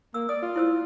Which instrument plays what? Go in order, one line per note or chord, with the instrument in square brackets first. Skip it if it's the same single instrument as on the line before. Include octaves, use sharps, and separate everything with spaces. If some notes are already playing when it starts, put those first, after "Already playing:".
[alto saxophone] A#3 [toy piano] E6
[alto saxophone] D5 [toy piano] D#6
[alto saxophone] F4
[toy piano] E4 C5 E6